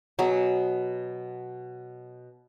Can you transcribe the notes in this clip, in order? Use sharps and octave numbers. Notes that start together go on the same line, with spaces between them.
B2 F#3 G#4